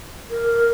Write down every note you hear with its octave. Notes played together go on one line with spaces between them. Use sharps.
A#4